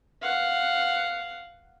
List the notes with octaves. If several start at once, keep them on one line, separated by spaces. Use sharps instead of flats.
F5 F#5